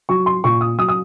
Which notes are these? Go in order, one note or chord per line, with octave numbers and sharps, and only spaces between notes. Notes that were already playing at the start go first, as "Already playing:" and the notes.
F#3 C#6
C6
A#2 C#6
D#6
F#3 D#6
D#6